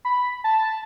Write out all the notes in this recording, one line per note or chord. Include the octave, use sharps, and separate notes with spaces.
B5
A5